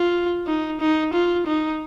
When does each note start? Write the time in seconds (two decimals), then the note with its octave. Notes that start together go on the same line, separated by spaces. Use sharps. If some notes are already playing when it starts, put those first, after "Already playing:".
Already playing: F4
0.47 D#4
0.80 D#4
1.13 F4
1.47 D#4